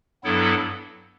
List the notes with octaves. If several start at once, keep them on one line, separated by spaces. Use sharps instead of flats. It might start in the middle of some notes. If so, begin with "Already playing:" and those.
G2 F#3 B3 E4 A4